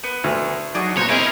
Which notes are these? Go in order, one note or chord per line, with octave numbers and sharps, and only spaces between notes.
B3
D2
F#3 D4 D#4 F#4 G#4
A#2 B3 F#4 C5 C#5 A#5
C4 E4 G#4 A#4 B4 D#5